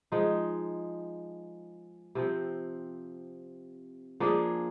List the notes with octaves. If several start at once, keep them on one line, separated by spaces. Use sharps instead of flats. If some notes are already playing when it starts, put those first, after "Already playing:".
F3 G#3 D#4
C3 F3 C4
F3 A#3 D4 G#4